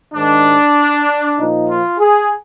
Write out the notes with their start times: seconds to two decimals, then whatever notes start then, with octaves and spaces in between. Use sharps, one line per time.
0.14 G#2 D#3 D4
1.38 A#2 F3 D#4
1.69 F4
1.99 G#4